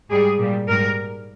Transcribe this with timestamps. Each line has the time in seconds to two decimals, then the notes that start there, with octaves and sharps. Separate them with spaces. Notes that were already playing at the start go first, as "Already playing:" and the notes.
0.10 G#2 G3 G#4
0.39 A#2 G3
0.68 G#2 G3 A#4